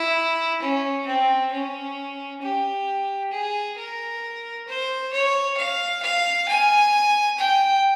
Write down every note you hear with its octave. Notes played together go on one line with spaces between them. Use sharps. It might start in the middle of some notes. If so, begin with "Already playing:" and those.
Already playing: E4
C#4
C4
C#4
G4
G#4
A#4
C5
C#5
F5
F5
G#5
G5